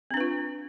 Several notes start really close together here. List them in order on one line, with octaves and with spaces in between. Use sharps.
C4 D4 B4 F4